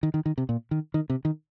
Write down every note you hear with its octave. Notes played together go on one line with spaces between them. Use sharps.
D#3
D#3
D#3
C3
A#2
D#3
D#3
C3
D#3